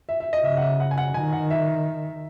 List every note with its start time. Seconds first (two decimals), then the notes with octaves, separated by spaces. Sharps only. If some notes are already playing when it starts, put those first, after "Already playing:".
0.09 E5
0.20 E5
0.33 D#5
0.44 C#3 E5
0.57 F#5
0.62 E5
0.80 F#5
0.91 G#5
0.98 F#5
1.14 D#3 G#5
1.33 F#5
1.50 E5